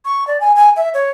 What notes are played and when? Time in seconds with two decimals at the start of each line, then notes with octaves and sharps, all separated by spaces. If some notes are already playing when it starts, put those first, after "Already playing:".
0.05 C#6
0.27 D5
0.40 G#5
0.56 G#5
0.76 E5
0.94 C#5